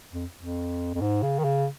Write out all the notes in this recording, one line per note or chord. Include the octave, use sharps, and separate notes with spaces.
F2
F2
F2
G#2
C#3
D#3
C#3